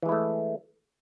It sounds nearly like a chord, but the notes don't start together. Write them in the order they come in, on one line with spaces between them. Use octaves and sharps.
E3 G#3 E4 A3